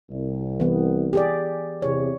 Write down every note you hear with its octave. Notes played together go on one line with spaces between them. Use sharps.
C2
E3 B3
G4 G#4 D5
E2 C3 C#5